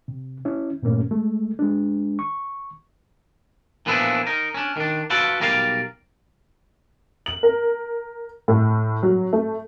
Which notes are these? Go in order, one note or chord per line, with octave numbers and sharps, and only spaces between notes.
C3
C#4 E4
G2 A#2 A3 A#3 C#4
G#3 A3
G#3 D4
C#6
A#2 F3 B3 D4 E4
D#4 A#4
C#4 D4
D#3 D4
F4 F#4 A4 B4 D5
B1 G3 A#4 D5 E5 F5
F#7
A#4
A2
F#3
A3